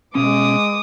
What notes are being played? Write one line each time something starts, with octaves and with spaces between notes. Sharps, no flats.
B2 G#3 C#4 D6 D#6